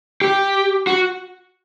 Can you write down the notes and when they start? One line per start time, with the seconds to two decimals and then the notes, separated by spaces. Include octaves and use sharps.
0.21 G4
0.87 F#4